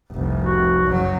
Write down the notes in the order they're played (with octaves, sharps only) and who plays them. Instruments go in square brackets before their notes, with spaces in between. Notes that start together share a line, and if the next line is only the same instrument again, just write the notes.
[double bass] F1 C2
[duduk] F#4
[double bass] F#1 F#3